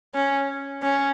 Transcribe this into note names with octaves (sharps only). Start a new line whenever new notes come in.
C#4
C#4